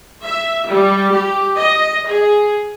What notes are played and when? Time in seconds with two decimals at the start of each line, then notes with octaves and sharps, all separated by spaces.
0.24 E5
0.67 G3
1.12 G4
1.56 D#5
2.08 G#4